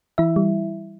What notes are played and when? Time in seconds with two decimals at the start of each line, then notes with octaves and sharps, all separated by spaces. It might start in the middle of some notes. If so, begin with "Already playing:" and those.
0.18 E3 E4 E5
0.36 G3